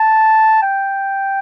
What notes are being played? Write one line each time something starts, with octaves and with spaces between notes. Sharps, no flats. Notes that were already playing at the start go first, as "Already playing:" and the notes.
Already playing: A5
G5